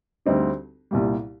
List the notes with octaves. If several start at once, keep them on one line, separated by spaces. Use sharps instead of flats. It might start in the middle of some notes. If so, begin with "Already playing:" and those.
D2 D3 G3 C4 D#4
C2 A#2 G3